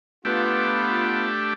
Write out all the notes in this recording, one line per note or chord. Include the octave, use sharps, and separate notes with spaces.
A3 B3 D4 F4 G4